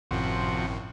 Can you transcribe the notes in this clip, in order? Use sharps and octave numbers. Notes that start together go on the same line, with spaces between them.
G#1 F#2 A2 C3 F3 F#4